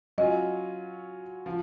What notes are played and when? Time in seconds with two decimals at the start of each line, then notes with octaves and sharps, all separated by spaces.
0.18 F#3 C#4 F4 D#5
1.46 F3